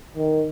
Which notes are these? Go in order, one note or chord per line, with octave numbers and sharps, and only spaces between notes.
D#3